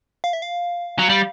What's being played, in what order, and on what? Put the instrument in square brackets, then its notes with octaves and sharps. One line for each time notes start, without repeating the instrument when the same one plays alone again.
[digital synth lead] F5
E5
F5
[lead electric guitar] F#3
G3